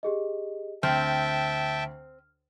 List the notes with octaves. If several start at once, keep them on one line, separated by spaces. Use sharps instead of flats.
G4 G#4 D#5
D2 C4 E5 G5 A5 F6